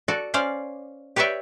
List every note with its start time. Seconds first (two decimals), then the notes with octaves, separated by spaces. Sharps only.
0.08 F#4 A4 D5
0.34 C#4 C5 D5 F5
1.16 G4 B4 C#5 D5 E5 G5